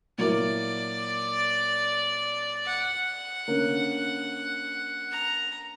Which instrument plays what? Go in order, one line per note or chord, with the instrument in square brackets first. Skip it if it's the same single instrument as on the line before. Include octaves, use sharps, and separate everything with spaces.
[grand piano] A#2 F#3 A#3 E4 [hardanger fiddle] D5
[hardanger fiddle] F#5
[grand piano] D3 A#3 C#4
[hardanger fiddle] A#5